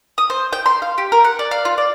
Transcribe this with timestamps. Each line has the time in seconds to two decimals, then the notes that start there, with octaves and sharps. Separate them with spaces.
0.18 D#6
0.30 C5
0.53 G5
0.66 C6
0.82 F5
0.98 G4
1.12 A#4
1.24 F#5
1.39 D5
1.51 F5
1.65 F4
1.78 D5